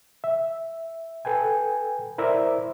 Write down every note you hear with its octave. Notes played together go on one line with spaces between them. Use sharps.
E5
A4 B4 G5 G#5
E4 A#4 C5 D5 E5